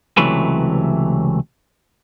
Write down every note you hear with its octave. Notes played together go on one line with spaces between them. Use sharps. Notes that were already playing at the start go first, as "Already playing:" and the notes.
C#2 C3 E3 F#3 A3 B4